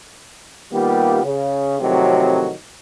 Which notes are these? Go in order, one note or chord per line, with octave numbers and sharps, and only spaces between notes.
D#3 G3 A#3 B3 F4 G4
C#3
F2 A2 C3 D#3 F#3